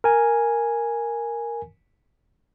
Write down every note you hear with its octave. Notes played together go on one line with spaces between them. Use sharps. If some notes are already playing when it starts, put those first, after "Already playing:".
A#4 G#5